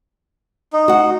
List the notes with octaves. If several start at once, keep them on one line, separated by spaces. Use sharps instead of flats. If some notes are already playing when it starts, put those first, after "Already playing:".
D#4
F#4 F#5